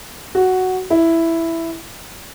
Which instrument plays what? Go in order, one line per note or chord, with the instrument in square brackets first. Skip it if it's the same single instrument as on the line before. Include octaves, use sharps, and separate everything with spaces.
[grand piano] F#4
E4